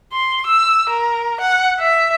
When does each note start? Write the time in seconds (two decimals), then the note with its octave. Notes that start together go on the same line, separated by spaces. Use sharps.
0.13 C6
0.47 E6
0.90 A#4
1.41 F#5
1.79 E5